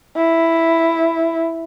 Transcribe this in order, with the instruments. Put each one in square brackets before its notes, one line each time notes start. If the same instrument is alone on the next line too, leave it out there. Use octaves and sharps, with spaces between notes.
[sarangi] E4